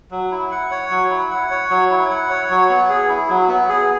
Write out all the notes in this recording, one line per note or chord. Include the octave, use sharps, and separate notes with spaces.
F#3
E4
F#5
C#5
F#3
E4
F#5
C#5
F#3
E4
F#5
C#5
F#3
B3
G#4
E4
F#3
B3
G#4